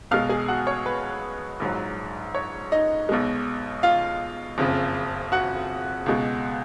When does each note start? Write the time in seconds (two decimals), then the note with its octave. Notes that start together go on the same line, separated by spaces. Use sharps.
0.11 B1 B2 G#3 F5 F6
0.29 G#4 G#5
0.48 F#4 F#5
0.67 C#5
0.86 B4
1.60 A#1 G#2 F#3
2.35 C#5
2.72 D#4 D#5
3.09 B1 B2 G#3
3.83 F4 F5
4.58 F#1 F2 C#3
5.32 F#4 F#5
6.06 C#2 B2 G#3